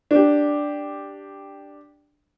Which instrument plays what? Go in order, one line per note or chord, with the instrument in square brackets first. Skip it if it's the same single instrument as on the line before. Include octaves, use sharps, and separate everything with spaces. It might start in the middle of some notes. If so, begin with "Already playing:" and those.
[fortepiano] D4 G4